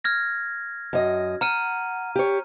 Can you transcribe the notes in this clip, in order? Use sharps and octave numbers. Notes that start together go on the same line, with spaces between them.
F6 G#6 A#6
F#2 D#5
F#5 A#5 F6 D#7
G4 C#5